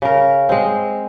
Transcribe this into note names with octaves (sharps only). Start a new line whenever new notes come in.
C#3 A#4
G#3 C4